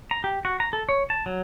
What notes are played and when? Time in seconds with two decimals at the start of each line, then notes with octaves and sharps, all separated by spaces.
0.11 A#5
0.24 G4
0.45 F#4
0.60 A#5
0.73 A4
0.89 C#5
1.10 A5
1.26 F#3